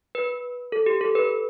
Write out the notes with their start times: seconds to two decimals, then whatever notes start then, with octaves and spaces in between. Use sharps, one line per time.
0.15 B4
0.72 A4
0.86 G4
1.01 A4
1.15 B4